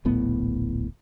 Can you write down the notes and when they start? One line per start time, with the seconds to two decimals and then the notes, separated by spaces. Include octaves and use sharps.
0.05 D1 A#1 A2 B3